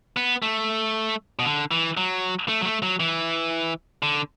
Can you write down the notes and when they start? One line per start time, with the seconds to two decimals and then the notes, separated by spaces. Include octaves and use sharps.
0.17 B3
0.42 A3
1.39 B2
1.45 D3
1.71 E3
1.97 F#3
2.49 A3
2.61 F#3
2.65 A3
2.83 F#3
3.00 E3
4.03 D3